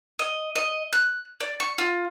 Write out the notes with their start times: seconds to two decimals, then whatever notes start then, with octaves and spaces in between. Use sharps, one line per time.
0.19 D#5
0.56 D#5
0.93 F#6
1.41 D5
1.60 C#6
1.78 F4